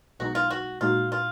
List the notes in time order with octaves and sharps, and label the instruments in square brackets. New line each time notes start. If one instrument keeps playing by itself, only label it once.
[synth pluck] B1 B2 G#3 D#4 [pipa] F#4
[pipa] F4
F#4
[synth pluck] A#2 G#3 D#4 F#4 [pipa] F4
[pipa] F4